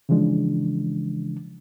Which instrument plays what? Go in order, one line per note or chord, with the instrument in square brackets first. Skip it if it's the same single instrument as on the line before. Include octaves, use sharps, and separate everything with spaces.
[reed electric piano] C#3 E3 F3 G#3 D4